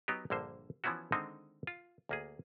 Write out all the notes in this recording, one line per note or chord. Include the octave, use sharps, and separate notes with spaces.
F#3 B3 D#4 G4
A#1 G2 D3 A#3 C5
E3 F3 B3 C#4 E4 F#4
D3 D#3 G#3 C4 D4 D#4
F4
D2 A#3 G#4